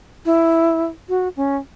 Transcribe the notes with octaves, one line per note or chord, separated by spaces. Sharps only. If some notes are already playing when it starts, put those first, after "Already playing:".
E4
F#4
C#4